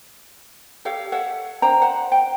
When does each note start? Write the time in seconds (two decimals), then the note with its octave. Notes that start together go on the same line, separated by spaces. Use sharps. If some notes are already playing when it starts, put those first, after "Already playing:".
0.85 G4 A4 C#5 F5
1.12 A4 C#5 E5 F#5
1.62 D4 C5 G5 A#5
1.82 C5 F#5
2.12 G5